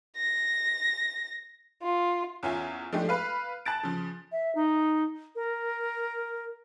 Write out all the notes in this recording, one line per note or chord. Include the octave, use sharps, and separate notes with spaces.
A#6
F4
E2 C#4 F4 E5 G#5
F3 G#3 A3 D4 G4
B4 F5
A5 F#6 A6 D7
C#3 F3
E5
D#4
A#4